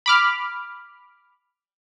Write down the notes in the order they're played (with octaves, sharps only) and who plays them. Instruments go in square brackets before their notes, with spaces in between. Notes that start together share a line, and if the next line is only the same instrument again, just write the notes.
[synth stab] B5 D6 F6